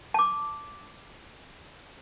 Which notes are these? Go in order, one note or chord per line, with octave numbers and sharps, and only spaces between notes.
A5 D6